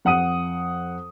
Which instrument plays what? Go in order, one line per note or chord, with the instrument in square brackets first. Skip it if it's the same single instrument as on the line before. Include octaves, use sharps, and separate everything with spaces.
[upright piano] F2 F#5 D#6 D#7